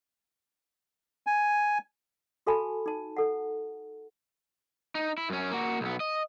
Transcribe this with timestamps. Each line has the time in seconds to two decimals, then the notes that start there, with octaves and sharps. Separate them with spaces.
1.27 G#5
2.46 F#4 A4 F5 G#5 A5 B5
2.86 D#4 A5
3.17 A4 F#5
4.95 D#4
5.18 E4
5.30 F#2 C#4
5.51 A#3 F#4
5.81 B1 B3
6.00 D#5